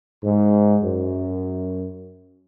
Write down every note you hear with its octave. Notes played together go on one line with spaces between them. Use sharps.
G#2
F#2